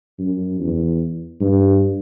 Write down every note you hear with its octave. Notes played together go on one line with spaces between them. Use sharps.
F#2
E2
G2